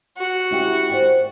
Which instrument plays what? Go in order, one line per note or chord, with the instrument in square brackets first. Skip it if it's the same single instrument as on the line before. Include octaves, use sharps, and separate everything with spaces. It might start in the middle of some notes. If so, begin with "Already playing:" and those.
[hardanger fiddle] F#4
[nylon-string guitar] C#4 E4 G4
C5 D5 G5